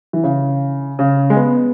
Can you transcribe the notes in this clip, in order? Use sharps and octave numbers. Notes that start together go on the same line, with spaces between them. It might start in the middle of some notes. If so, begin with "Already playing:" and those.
E3
C#3
C#3
G#3
B3